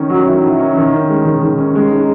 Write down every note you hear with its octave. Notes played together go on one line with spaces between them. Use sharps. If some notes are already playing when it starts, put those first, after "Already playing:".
Already playing: D#3 C#4
F#3
E4
D#3
C#4
D#3
C#4
G#3
D#3
D#3
C#4
G#3
D#4